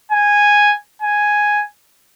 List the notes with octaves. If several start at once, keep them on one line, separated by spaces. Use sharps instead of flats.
G#5
G#5